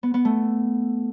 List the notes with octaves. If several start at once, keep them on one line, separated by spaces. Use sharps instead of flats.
B3
B3
A3